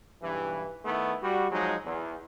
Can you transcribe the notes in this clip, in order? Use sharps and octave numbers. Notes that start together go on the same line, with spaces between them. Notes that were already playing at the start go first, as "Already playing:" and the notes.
B1 G2 E3
D#3 A3 B3 E4
G3 F#4
F3 F#3 G#3 D#4
E2